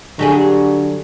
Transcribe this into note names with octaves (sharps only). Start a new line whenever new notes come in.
D3 F#3 G4 G#4